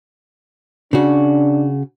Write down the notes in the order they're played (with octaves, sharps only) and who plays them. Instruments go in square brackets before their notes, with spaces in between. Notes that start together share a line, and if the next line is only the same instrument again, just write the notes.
[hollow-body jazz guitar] C#3 F#4 [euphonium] D4